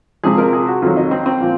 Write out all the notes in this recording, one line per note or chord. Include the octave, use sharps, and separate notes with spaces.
C3 F3 G#3 G#4
A#4
G#4
F#4
F2 D#3 F#3 F4
D#4
C4
C4
A#2 F3